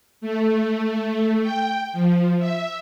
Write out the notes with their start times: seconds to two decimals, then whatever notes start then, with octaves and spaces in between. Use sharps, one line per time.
0.21 A3
1.42 G5
1.93 F3
2.39 E5